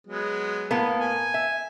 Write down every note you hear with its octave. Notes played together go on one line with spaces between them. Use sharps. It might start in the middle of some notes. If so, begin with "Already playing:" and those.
F#3 G#3 B3
A2 A#3 B3
G#5
E5